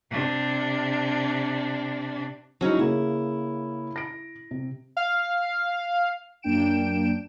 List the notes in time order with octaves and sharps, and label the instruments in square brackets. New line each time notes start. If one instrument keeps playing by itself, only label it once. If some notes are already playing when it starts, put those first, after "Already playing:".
[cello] C3 D4
[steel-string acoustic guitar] F#3 C#4 D#4 [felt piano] G#3 E4
[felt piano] C#3 A#3 C#4 [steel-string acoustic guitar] E4
[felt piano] A#6 D7
C3
[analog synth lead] F5
[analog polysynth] F#2 A#3 D4 G5 D7 E7